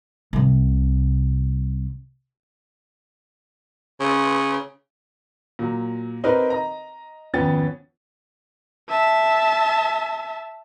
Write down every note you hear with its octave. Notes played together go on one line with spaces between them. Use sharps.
C2 C3
C#3
A#2 F#3
C4 D#4 G4 A#4 B4
D#5 A#5
G#1 F2 B3 C#4 G5 A6
E5 A5